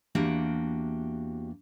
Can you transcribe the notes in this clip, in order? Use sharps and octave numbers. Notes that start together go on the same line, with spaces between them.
E2 A#3 D4 F#4 G4